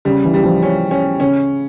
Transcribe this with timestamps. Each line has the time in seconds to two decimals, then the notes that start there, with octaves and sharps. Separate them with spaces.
0.05 C#3 G3
0.25 E3
0.34 G3
0.44 F3
0.63 C#4
0.91 C#4
1.20 C#3 C#4